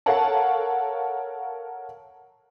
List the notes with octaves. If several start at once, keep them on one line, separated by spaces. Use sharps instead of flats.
A4 A#4 C#5 F5 F#5 A5